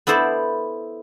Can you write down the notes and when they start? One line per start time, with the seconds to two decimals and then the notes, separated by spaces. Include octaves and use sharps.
0.07 B3 E4 A4 C5 D5